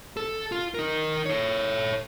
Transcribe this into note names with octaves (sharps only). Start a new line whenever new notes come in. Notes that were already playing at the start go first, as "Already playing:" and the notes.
A4
F4
D#4 A#4
A4 C#5